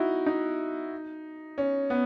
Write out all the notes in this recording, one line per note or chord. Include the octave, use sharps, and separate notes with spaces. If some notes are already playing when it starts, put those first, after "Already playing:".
Already playing: D#4 E4 F#4
D#4
C#4
B3